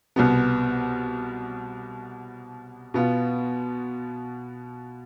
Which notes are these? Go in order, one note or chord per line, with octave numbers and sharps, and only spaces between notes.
C2 B2 B3
B2 B3 F4